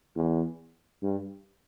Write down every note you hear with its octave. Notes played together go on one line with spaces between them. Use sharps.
E2
G2